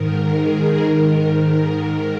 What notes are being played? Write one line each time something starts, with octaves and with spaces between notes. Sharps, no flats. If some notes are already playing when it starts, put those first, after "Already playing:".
Already playing: G#2 D#3 A#4
G#4
G#2 D#3 A#4